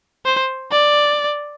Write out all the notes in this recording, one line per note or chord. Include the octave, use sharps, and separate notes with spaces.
C5
D5